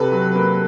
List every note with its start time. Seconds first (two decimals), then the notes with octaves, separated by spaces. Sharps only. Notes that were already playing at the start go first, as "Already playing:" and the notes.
Already playing: C3 A4 B4
0.12 F#3
0.35 A#3